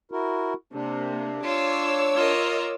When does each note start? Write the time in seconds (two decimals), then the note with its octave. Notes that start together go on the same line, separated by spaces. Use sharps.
0.12 E4 F#4 A#4
0.73 C3 A#3 D4
1.44 F4 C#5 D6 E6
2.14 F4 A#4 D#5